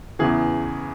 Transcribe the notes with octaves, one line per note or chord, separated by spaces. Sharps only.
E2 C#3 E3 G#4